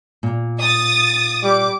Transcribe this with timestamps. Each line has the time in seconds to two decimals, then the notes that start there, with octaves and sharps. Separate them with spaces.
0.23 A#2
0.60 D#6 A6
1.43 G3 D6